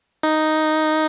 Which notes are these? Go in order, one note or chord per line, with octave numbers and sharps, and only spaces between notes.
D#4